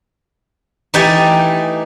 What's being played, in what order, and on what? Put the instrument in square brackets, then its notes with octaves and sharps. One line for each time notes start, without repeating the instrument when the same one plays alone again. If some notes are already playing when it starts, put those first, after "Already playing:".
[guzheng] E3 A3 D#4 G4 G5 G#5